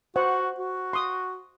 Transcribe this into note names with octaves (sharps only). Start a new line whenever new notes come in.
F#4 C5 F#5
F#4
C6 D#6